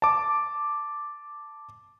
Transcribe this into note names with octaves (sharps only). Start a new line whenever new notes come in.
A5 D6